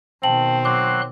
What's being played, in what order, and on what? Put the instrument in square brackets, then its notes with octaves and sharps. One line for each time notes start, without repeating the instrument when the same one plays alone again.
[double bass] B2 D#3 [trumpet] C4 [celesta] G5 A5 F#7
[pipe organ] F#3 C6 F#6 [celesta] D6